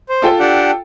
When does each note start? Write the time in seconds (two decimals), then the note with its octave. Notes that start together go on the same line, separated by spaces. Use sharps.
0.09 C5
0.22 F4 A4 G5
0.39 D4 G4 F#5